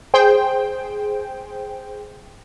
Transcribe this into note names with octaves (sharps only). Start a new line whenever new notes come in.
G#4 C5 G5